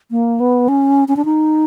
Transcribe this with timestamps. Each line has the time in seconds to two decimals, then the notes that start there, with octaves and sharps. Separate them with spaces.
0.11 A#3
0.40 B3
0.68 C#4
1.08 C#4
1.16 D4
1.25 D#4